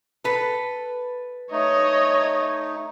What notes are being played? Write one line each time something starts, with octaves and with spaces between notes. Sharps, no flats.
A4 B4
A3 D#4 C#5 D#5